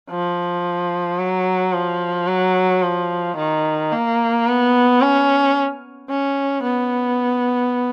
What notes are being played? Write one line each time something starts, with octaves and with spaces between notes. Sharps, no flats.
F3
F#3
F3
F#3
F3
D#3
A#3
B3
C#4
C#4
B3